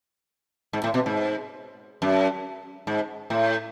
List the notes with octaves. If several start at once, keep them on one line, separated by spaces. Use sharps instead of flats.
G#2
A2
B2
G#2
F#2
G#2
A2